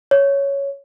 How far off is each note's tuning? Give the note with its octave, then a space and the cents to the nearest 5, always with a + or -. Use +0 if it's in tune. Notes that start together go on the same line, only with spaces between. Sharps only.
C#5 +5